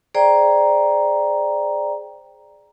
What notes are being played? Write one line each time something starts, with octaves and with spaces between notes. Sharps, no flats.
G#4 C5 D5 G5 A#5